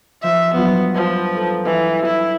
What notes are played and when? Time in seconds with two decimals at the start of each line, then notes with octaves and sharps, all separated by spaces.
0.23 F3 D#4 E5
0.54 G2 F#3 B3 F4
0.95 F3 B4
1.35 D#4 A4
1.65 E3
2.06 E4